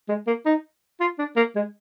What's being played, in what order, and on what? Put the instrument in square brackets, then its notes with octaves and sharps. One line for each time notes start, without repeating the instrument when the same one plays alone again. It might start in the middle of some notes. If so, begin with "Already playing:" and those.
[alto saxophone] G#3
A#3
D#4
F4
D4
A#3
G#3